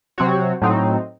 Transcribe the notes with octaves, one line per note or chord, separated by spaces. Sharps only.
C3 F#3 C4 F#4 C#5
A2 F#3 C4 D#4